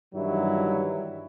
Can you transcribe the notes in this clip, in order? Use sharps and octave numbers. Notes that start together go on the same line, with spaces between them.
G2 D#3 E3 F#3 G3 E4